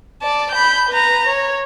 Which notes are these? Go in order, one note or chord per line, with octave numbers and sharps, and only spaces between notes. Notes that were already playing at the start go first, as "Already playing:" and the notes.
D5 A5
B5 G6
B4 A#5
C#5